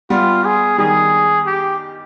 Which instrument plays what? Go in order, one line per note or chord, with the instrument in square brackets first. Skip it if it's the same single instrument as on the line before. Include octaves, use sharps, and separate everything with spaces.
[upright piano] G3 B3 [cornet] F4
[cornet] G#4
[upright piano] D#3 G3 [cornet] G#4
[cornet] G4